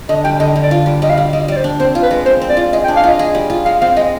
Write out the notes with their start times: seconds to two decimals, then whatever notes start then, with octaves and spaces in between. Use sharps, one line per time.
0.09 D3 D#5
0.25 G3 G5
0.40 D3 D#5
0.56 D3
0.63 D5
0.71 F4
0.86 G3
1.02 G3 D#5
1.10 F5
1.17 G3
1.33 G3 D#5
1.48 G3 D5
1.56 C5
1.64 D4
1.79 C4 C5
1.95 F4
2.03 B4
2.11 G#3
2.25 C4 C5
2.41 C4
2.50 D5
2.57 F4
2.73 G#4 D#5
2.84 G5
2.88 D4
2.96 F5
3.04 F4 D#5
3.19 G#4
3.35 G3
3.50 F4
3.65 G#3 F5
3.81 C4 F5
3.96 G#3 D#5